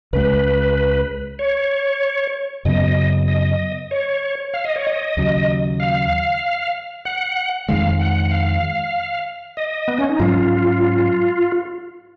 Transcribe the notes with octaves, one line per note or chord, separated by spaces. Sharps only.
C#2 C#3 G#3 B4
C#5
F#2 C#3 F#3 B3 D#5
D#5
C#5
F5
D#5
C#5
D#5
D#2 C#3 F#3
F5
F#5
F2 D#3 G#3 F5
F#5
F#5
F5
D#5
B3
C#4
D#4
G#2 F#3 C#4 F4